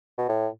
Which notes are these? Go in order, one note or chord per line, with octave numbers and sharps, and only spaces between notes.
B2
A2